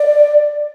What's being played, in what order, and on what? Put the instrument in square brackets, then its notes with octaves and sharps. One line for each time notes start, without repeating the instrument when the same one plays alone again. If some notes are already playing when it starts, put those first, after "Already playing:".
Already playing: [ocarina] D5